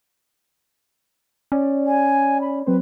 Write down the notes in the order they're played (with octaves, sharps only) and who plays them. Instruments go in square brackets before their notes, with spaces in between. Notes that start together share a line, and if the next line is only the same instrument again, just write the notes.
[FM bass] C#4 [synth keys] D5
[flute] G#5
B5
[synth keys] F#3 C4 C5 [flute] B4